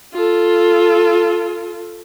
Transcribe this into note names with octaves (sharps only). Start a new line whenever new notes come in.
F4 A4